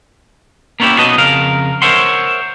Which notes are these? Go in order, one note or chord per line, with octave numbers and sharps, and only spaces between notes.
A#3 B3 C#4 D#4 E4 G4
B1 F#3 B3 B4 D#5 A5
F2 C#3 A#4 F5
A#4 C5 C#5 E5 F#5 C6